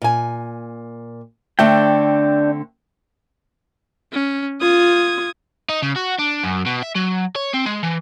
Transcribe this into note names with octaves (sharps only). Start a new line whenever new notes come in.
A#2 G#5
D3 A3 C4 D4 G5
C#4
F4 D#6 G#6
D#4
C#3
F#4
D4
F#2
B2
E5
F#3
C#5
C4
G#3
E3